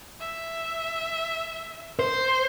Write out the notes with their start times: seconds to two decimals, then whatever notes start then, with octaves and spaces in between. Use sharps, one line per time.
0.20 E5
1.99 C5